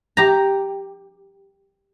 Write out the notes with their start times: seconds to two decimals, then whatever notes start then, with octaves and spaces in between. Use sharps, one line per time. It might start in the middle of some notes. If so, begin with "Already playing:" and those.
0.17 G4 A#5